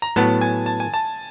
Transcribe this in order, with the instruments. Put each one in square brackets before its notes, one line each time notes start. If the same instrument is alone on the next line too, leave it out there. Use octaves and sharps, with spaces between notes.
[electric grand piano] A#5
[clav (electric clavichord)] A2 F#3 B3 [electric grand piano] A5
[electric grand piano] G#5
A5
G#5
A5